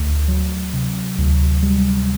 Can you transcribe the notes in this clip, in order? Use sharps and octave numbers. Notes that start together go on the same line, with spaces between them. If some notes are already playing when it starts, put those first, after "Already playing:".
Already playing: D2 A3
F#3
C3
D2
G3